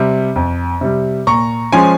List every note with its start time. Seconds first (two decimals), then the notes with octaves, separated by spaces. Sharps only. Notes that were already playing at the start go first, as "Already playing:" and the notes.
Already playing: C3 G3
0.36 F2
0.81 C3 G3
1.27 A#2 A#5 C#6
1.72 F3 G#3 C#4 G#5 C6